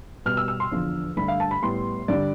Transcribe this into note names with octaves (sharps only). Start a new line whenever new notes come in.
B2 G3 B3 F6
E6
E6
C6
E2 D3 F3
G2 D3 A3 B5
F5
A5
B5
A2 G3 B3 C6
G2 D3 G3 D5